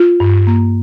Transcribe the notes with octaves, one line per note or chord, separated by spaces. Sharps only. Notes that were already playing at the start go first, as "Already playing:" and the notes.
Already playing: F4
G2
A#3